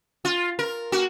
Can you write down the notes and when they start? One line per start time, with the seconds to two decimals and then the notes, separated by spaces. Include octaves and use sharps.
0.25 F4
0.59 A#4
0.92 A#3 F#4